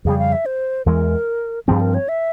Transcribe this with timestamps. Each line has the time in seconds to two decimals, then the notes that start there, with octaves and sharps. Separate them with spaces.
0.05 F2 C#3 G3 G#4
0.19 F5
0.32 E5
0.46 C5
0.86 E2 E3 G#3 A#4
1.68 G2 F3 C4 G#4
1.81 A#4
1.94 C#5
2.09 E5